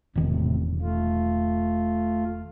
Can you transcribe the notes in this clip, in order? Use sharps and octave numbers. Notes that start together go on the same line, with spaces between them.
E1 A2 C3 D#3
A3 F4